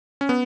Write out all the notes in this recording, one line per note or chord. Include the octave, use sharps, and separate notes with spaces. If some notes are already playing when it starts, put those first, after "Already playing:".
C#4
B3